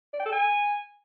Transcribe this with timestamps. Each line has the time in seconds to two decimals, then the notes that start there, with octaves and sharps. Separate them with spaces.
0.13 D5
0.20 G5
0.26 A4
0.32 G#5